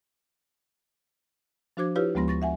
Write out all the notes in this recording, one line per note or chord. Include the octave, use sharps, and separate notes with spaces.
F3 D4 F#4 C5 D6 G#6
E4 F4 G4 B4 C#5 F5
D2 F3 G#3 B3 C6 A#6
C#6 A6 A#6
E5 F#5 G#5